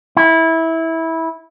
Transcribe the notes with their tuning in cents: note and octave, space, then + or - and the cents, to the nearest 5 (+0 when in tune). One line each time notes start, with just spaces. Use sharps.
E4 -15